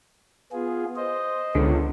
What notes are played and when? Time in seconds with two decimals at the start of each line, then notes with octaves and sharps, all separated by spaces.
0.52 B3 F4 G#4
0.96 C5 D#5
1.55 C#2 D3 B3